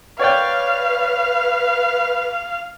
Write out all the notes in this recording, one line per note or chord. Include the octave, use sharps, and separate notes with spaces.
B4 C#5 D5 F5 G5